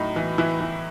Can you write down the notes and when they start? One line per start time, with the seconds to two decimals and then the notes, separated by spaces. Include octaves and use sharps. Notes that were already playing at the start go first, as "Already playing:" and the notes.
Already playing: A2 F#3 D#4
0.16 E3
0.38 E3 E4
0.61 E3